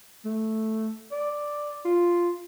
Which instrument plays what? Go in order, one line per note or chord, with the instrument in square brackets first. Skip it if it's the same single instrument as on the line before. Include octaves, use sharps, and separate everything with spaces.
[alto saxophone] A3
D5
F4